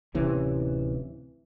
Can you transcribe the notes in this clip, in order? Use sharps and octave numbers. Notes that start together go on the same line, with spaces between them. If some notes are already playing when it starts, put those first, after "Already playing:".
D1 C3 E3 C#4